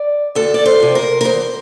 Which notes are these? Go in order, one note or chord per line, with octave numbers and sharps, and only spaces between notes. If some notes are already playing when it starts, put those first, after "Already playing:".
Already playing: D5
D2 A4
D5
C5
C3 F3
A#4
A#4
E2 C5